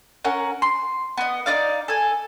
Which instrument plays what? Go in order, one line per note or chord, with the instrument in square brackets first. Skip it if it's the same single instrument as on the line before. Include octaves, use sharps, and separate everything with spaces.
[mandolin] C#4 A#4 F#5
C6
B3 D#5
D#4 A#4 D5 F5
A4 G#5